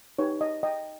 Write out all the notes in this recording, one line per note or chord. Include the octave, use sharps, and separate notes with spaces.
D#4 G4 B4 C#5
D#5
D#5 G5